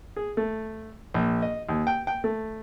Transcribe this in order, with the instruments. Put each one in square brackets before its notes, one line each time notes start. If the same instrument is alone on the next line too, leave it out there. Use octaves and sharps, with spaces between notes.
[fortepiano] G#4
A3
A#1
D#5
D#2
G5
G5
A3